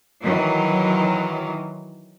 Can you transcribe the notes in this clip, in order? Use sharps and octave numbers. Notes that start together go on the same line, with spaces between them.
D#3 E3 F#3